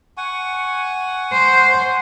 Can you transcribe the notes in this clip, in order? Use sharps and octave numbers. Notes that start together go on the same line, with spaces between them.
F#5 G#5 C#6
C5